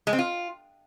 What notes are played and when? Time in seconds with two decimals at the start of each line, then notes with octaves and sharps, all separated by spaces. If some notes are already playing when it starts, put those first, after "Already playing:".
0.07 G#3
0.13 C4
0.19 F4